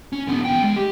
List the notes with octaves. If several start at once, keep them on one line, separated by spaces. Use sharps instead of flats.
C#4
D3 B3
E2 G5
G#3
G4